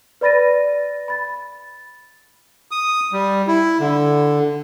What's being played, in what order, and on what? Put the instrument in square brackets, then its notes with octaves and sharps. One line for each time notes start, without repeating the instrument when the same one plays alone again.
[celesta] B4 D5 B5 A6 A#6 D#7
B5 A6
[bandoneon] D#6
G3
E4
D3